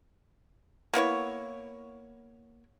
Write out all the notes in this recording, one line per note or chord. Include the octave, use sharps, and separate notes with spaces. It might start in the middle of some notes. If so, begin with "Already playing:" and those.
A#3 B3 E4 C#5